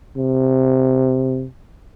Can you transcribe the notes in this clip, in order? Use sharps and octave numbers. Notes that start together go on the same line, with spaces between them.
C3